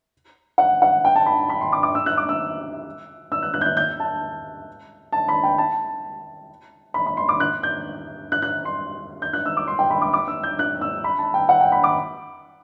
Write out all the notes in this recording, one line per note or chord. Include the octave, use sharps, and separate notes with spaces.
F#5
F#5
G5
A5
B5
B5
C6
D6
D6
E6
F#6
D6
E6
E6
F#6
F#6
G6
F#6
G6
A5
A5
B5
G5
A5
B5
B5
C6
D6
F#6
G6
F#6
F#6
C6
G6
F#6
E6
D6
C6
G5
B5
D6
D6
E6
G6
F#6
E6
B5
A5
G5
F#5
G5
B5
D6